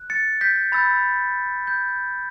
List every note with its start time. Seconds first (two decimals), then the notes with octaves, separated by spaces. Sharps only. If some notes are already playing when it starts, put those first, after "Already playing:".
Already playing: F#6
0.10 A6 C#7
0.41 G6 B6
0.72 B5 E6 G6 A6
1.67 G6